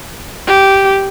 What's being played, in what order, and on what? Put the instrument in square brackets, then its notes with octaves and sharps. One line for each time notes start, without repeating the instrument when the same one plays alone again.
[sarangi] G4